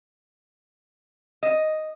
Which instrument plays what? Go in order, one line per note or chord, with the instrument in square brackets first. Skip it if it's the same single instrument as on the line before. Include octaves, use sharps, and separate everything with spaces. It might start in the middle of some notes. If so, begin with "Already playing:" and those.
[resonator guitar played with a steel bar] D#5